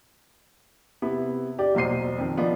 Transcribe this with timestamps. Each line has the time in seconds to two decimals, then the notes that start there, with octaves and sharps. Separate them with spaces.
1.02 C3 B3 E4
1.58 D4 G4 D5
1.75 E1 B1 A#2 C5 C7 D#7
2.18 F2 D#3
2.37 F3 B3 D4 D#4 F4